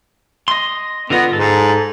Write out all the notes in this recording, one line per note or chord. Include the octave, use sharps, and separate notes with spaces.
D#5 C6
D3 B3 F4 D#5
G#2 A4